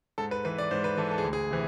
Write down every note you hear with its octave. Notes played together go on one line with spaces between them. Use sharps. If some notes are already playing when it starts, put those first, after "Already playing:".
G#2 A4
B4
E3 B4
D5
G#2 C5
B4
E3 A4
A4
G#4
D2
G#4
C3 E3